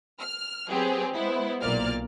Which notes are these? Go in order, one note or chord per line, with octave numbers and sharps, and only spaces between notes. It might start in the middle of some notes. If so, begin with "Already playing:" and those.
F6
F#3 B3 C4 G4 G#4
G#3 B3 E4 C5
B1 A#2 A#3 D5 F6